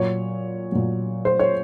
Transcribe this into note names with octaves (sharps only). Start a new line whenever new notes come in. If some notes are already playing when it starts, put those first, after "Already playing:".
Already playing: A#2 F#3 C#5
A#2 F#3
C5
C#5